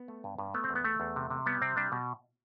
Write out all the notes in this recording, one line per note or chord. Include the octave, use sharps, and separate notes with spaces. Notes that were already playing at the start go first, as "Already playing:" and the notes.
Already playing: B3
A3
G2
G2
A3 B3
C4
E2
B3
A3
E2
C3
C3
G3 B3
C3 C4
G3 D4
B2